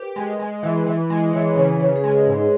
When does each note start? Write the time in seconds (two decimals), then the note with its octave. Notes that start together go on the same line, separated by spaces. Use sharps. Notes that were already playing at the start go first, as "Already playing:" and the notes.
Already playing: G4 A#4 B4
0.16 G#3
0.39 G#3
0.63 E3
0.87 E3
1.10 G#3
1.33 E3 C#5
1.56 C#3
1.64 B4
1.79 C#3
1.96 G#4
2.04 G#3
2.27 G#2